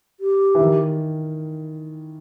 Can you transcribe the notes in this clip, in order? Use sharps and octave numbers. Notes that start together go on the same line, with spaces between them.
G4
E3
D#3